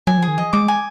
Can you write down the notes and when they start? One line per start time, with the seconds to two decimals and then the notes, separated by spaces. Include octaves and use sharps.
0.07 F#3 G#5
0.17 F3
0.22 G#4
0.28 D#3
0.38 F3 D#5
0.53 G#3 D6
0.68 G#5